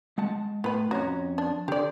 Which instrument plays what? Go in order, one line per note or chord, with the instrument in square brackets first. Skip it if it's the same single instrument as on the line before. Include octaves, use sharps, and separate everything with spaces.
[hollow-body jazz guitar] G#3 F#5 A5
[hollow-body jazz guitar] A2 [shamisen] B3 B4
[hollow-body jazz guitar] F2 C#4 A#5 [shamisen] F#4
[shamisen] D4
[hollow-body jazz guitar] D3 [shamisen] G4 D5